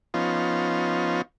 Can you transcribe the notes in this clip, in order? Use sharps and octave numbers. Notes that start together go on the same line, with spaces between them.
F3 B3 C#4 D#4 F4